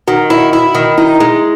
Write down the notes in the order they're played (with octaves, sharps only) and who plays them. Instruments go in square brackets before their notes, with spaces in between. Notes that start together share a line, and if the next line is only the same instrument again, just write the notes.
[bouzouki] D#3 [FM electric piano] F#4
[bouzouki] E4
E4
D#3
[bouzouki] D#4 [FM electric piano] E4
[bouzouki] G#3